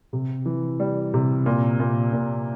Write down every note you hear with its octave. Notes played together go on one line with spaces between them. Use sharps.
C3
E3
G3
C3
A#2
A#2
A#2